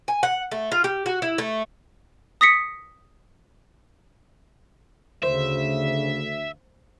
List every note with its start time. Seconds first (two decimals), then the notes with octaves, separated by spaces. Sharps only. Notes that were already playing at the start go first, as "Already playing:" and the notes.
0.08 G#5
0.23 F#5
0.51 A3
0.72 F4
0.84 G4
1.06 F#4
1.22 E4
1.38 A3
2.41 D#6 A#6 B6 C#7
5.23 D2 C#3 C5 E5